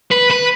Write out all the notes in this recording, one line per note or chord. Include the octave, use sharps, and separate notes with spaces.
B4
B4